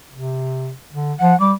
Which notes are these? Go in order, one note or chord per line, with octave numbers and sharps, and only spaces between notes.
C3
D3
F3 F#5
G3 D6